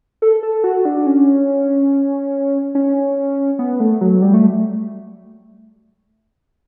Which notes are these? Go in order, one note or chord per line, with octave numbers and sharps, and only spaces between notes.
A4
A4
F#4
D4
C#4
C#4
B3
A3
F#3
G3
A3